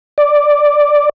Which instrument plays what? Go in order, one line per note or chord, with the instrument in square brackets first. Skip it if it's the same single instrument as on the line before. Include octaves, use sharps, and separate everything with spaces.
[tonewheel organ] D5